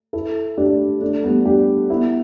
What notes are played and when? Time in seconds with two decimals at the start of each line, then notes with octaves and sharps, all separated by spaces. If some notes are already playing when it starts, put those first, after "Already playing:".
0.13 E4 A4
0.57 D4 G4
1.01 A3 D4
1.23 G3 B3
1.45 D4 G4
1.90 B3 E4